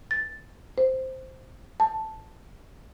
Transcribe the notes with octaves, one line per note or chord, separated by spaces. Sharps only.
A6
C5
A5